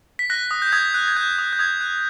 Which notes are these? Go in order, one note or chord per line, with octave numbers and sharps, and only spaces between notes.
B6
F#6 A#6
D#6
G6
D#6 G#6
F#6
G#6
F#6 G6
D#6
G6
D#6 G#6
F#6